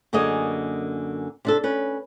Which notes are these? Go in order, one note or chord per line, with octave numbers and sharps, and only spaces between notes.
F#2 D3 A#3 G#4 D#5
C3 D4 A4
C#4 B4